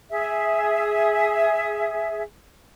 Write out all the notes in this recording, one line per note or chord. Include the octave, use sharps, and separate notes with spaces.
G#4 E5